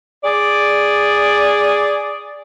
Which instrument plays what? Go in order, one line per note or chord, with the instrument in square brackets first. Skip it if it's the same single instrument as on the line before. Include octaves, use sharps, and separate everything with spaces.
[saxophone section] G#4 D5